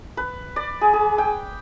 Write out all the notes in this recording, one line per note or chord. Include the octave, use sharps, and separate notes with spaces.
B4
D5
G#4
G#4
G5